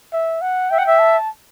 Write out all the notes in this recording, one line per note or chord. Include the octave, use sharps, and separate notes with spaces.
E5
F#5
E5 G5
F#5
E5
A5